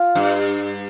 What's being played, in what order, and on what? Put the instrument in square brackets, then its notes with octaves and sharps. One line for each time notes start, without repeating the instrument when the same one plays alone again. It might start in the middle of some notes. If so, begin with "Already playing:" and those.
Already playing: [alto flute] F4
[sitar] G2